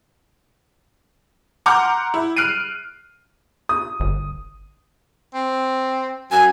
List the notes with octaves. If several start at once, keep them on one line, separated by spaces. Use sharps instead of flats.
F#5 A#5 C6 D6 F6 G6
E4
F6 F#6 C7 D7 D#7
D#6
G1
C4
F#2 G#5